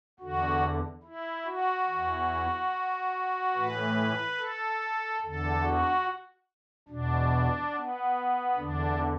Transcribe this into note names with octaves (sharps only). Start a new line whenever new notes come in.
E2 D3 F#4
E4
F#4
E2 E3
A2 E3 B4
A4
E2 D3 A4
F#4
E2 B2 D4
B3
E2 D3 D4